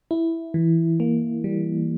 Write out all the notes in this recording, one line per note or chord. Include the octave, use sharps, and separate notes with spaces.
E4
E3
A#3
G3